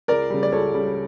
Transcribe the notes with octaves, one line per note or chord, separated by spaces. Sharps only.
C#2 A#4 D5
C#3 G3
D5
C#2 A4 C#5
C#3 G3